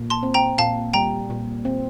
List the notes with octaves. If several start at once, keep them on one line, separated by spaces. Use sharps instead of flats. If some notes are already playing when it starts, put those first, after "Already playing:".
Already playing: A#2
A5 C6
C4
G5 A#5
A#2 F5 A5
G3 G5 A#5
A#2
C4